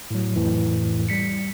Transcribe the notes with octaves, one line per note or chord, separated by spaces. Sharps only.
A2 F#3
F2 A2 E3
G3 B6 C#7